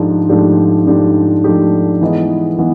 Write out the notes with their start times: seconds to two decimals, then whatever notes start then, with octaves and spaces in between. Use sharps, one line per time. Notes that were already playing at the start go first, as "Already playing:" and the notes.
Already playing: G#2 F3 A3 D4 G4
0.29 G#2 F3 A3 D4 G4
0.87 G#2 F3 A3 D4 G4
1.44 G#2 F3 A3 D4 G4
2.02 E3 G#3 B3 D#4
2.59 E3 B3 D#4